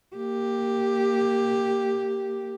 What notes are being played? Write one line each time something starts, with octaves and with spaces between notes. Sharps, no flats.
A#3 G4